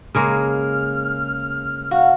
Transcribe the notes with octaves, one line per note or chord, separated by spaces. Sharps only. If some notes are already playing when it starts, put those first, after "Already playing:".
C#3 G#3 A#3 F6
F#4 F5 F#5